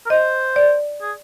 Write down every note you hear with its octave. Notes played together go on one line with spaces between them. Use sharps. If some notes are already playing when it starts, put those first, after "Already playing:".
A#4
C5 D#5
D5
G#4